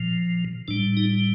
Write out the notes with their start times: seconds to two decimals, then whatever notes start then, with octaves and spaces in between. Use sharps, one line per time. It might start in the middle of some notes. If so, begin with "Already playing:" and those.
Already playing: A#2 F3
0.68 A2 G3 D4
0.97 D#4